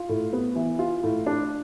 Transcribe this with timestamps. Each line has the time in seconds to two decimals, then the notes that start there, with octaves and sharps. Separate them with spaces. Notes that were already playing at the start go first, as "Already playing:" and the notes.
Already playing: F4
0.09 A2
0.33 B3
0.56 E3
0.79 F4
1.03 A2
1.26 D4